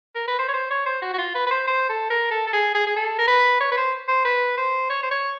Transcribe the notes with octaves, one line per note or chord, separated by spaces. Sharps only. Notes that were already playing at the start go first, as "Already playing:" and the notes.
A#4
B4
C5
C#5
C5
C#5
C5
F#4
F#4
F4
B4
B4
C5
C5
A4
A#4
A4
A4
G#4
G#4
G#4
A4
A#4
B4
C#5
B4
C5
C5
B4
C5
C#5
C5
C#5